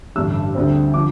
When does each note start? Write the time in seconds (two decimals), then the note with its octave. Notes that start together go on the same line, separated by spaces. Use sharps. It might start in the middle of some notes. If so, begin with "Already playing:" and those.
0.16 A1 G2 D3 E6
0.55 D2 D3 G3 C4
0.94 D3 F3 D6